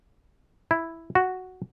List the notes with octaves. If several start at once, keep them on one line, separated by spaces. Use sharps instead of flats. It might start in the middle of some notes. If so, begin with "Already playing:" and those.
E4
F#4